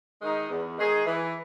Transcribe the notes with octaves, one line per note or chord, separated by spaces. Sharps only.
D#3 G#3 D#4 G#4
E2
D#3 G#3 D#4 G#4
E3